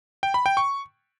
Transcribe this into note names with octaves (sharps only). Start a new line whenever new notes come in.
G5
B5
G5
C#6